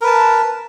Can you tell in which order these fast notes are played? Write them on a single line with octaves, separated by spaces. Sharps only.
A#4 B4 A5